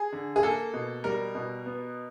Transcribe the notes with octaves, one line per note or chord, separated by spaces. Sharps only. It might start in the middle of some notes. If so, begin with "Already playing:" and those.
Already playing: G#4
D3
G#4
A#3 A4
B2
G3 A#4
B2
B3